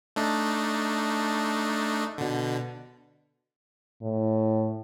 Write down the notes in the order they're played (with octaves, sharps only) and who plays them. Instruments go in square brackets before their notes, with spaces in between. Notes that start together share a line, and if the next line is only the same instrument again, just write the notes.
[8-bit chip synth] A3 D4 D#4
B2 D3
[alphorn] A2